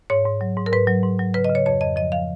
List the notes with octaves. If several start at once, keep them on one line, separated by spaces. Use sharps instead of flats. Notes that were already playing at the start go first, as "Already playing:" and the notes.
G#2 C#5
G#2
F#3
G#2
A#4
G#2 B4
F#3
G#2
F#3
C#3 B4
D#5
C#3
C#5
F2 C#5
F2 D#5
F3 D#5
F3 F5